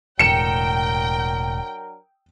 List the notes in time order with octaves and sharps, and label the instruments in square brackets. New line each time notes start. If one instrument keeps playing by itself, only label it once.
[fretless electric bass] E1 A2 [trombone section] F#3 D4 A#4 [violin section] G5 [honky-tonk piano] C#7 E7